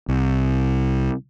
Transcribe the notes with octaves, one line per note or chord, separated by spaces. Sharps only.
C2